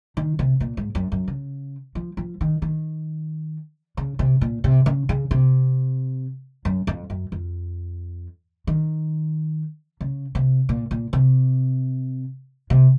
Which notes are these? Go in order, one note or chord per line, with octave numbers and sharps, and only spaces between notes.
D#3
C3
A#2
G#2
F#2
F#2
C#3
F3
F3
D#3
D#3
C#3
C3
A#2
C3
C#3
C#3
C3
F#2
F2
F#2
F2
D#3
C#3
C3
A#2
A#2
C3
C3